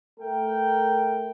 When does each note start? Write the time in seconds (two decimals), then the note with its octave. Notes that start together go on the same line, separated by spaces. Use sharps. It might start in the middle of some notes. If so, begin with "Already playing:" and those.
0.20 A3 A#4 G5